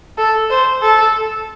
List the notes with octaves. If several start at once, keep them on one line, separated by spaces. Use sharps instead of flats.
A4
C5
A4